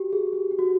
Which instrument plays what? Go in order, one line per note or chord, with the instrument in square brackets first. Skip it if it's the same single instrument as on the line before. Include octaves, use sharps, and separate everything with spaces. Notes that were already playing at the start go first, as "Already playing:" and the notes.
Already playing: [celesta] F#4 G4
G#4
G4
G4
F#4